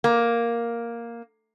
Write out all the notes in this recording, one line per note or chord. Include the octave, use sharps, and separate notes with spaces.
A#3